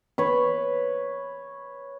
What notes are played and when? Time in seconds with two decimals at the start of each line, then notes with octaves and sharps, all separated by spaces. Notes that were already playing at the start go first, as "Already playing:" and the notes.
0.18 B4 C#5